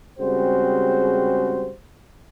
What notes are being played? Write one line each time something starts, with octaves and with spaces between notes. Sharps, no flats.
C#3 G3 G#3 C4 F#4 C5